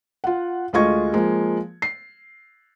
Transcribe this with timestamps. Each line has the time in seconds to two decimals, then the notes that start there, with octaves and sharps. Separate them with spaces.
0.24 F4 F#5
0.73 D2 G#3 F4 D#5 C#6 G#6
1.14 F3 G#3 A#3
1.82 C7